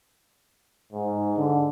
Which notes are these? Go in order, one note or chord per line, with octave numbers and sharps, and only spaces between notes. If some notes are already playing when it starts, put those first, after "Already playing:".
G#2
D3